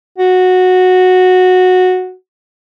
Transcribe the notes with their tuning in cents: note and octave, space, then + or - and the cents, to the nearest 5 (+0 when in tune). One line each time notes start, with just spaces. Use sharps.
F#4 -10